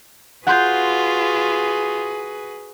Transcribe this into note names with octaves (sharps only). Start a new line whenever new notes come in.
F4 F#4 G#4 B4 F#5 C6 G6